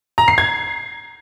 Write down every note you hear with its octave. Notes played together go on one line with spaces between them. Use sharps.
A#5
C7
G#6